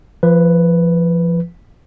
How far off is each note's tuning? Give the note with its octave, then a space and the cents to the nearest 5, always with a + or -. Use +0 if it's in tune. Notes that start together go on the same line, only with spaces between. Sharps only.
F3 -30 B4 +0